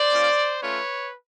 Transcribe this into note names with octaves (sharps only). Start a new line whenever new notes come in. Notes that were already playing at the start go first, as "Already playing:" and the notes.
Already playing: C5 D5
A#3 C#4 F4
A3 C#4 F4 B4 C#5